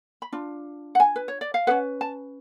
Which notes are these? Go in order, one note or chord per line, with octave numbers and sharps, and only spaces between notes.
B5
D4 F4
F#5
G#5
B4
C#5
D5
F5
C#4 G#4 B4 F#5
A5